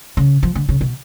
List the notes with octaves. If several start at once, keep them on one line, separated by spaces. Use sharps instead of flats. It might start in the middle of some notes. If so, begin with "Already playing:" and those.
C#3
F3
D3
C#3
B2